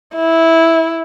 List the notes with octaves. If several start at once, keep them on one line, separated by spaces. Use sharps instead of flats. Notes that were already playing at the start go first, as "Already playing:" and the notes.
E4